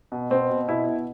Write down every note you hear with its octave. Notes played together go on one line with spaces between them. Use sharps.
B2
B2 C4
B2
B2 E4
B2